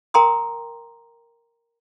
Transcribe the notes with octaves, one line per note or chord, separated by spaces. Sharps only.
A#4 G5 A#5 C6 D#6